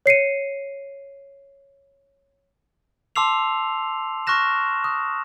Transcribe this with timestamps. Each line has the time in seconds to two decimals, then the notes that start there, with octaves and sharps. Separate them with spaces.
0.06 C#5 C7 C#7 D#7
3.16 A5 C6 D6 E6 C7 F7
4.27 C#6 F6 F#6 A#6 E7
4.84 D#6